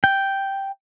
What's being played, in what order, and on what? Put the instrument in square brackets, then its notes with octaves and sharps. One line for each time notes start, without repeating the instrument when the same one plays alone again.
[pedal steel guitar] G5